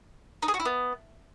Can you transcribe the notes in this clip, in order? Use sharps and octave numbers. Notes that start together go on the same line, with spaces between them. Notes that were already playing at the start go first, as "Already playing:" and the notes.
D#4
G#4
F#4
E4
B3